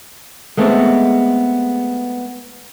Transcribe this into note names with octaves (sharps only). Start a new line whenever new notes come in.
G#3 A3 B3 C4